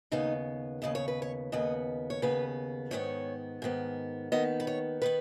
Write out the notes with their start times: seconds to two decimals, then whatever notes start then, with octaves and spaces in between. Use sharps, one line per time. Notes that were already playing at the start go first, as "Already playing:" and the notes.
0.12 D#2 C#3 B3 D#4
0.82 D#2 C#3 B3 D#5
0.95 C#5
1.08 B4
1.22 C#5
1.52 D#2 C#3 B3 D#5
2.10 C#5
2.22 D#2 C#3 B3 B4
2.91 G#2 D#3 B3 C#5
3.62 G#2 D#3 B3
4.32 D#2 D#3 B3 D#5
4.60 B4
4.67 C#5
5.02 D#3 B3 B4